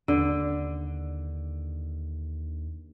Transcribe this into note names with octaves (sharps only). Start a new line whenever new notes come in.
D#2 D3